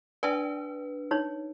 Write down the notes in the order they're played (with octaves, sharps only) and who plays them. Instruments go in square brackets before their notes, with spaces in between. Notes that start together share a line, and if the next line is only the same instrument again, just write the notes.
[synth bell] D4 B4 [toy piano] D5 G5 G#5
[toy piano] D#4 C#5